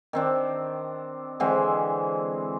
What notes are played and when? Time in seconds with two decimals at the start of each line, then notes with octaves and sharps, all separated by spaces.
0.13 D#3 C4 D4
1.40 D3 E3 G#3 C4